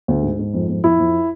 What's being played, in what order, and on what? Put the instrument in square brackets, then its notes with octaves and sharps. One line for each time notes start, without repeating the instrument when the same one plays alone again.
[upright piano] D2
G#2
G#2
F2
F2
F2 E4
F2